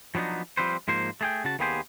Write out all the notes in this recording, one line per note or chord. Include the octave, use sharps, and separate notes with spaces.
F3 F#3 B3 D4 D#4
F3 G3 C4 B4 C5
G#2 F3 A#3 C5
A3 G#4 G5
C#3 F#4 A5
D#2 A#3 B3 G4 G#4 C5